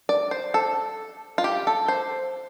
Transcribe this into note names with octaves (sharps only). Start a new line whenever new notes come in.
D5
C5
A4
F4
G4
A4
C5